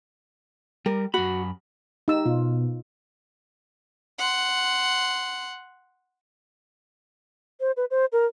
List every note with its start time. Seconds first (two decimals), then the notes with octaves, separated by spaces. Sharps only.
0.86 G3 A#4
1.14 F#2 F#4 B5
2.08 D#4 G4 E6
2.25 B2 F4
4.18 F#5 C6
7.60 C5
7.77 B4
7.91 C5
8.12 A#4